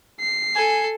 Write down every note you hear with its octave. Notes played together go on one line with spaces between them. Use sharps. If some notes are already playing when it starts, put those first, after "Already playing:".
C7
A4 G#5